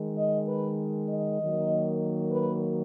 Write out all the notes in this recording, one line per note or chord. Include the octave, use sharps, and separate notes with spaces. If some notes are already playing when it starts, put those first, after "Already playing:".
Already playing: D#3 G#3
D#5
B4
D#5
D#3 F#3 A#3
B4